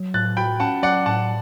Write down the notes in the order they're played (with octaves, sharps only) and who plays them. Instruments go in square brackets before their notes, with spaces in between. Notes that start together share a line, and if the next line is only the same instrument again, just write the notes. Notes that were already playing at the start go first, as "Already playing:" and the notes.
Already playing: [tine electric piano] F#3
[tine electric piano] A2 [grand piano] F#6 A6
[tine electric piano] F#4 [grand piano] G5 B5
[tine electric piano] C#4 [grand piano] F#5 A5
[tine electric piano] F#3 [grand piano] D5 F#5
[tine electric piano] A2 [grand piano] F#5 A5